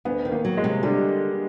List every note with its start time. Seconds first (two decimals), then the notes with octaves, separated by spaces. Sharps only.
0.05 D2 B3
0.25 D#3
0.31 A#3
0.45 F#3
0.57 G#3
0.64 C3
0.83 D3 G3